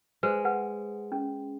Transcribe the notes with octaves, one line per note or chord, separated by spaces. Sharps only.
G#3 B4 C5
B4 F#5
C#4